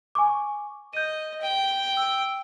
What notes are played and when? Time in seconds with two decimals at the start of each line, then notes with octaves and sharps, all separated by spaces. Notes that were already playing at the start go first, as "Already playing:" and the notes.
0.15 G#5 C#6 D6
0.93 D#5 G6 D#7
1.41 G5
1.97 E6